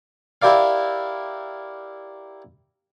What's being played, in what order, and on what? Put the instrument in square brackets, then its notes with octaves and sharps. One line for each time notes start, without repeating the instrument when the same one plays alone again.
[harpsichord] E4 G4 A#4 D5 F5